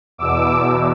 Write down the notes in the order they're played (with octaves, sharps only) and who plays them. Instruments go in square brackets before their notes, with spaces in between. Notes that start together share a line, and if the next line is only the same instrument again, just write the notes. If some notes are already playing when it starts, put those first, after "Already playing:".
[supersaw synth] E2 B2 D6 E6